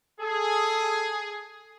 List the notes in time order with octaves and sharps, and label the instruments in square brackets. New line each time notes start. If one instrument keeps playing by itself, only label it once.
[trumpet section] G#4 [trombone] A4